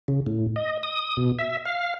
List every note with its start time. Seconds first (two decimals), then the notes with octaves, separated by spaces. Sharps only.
0.08 C#3
0.26 A2
0.56 D#5
0.83 D#6
1.17 B2
1.39 E5
1.65 F5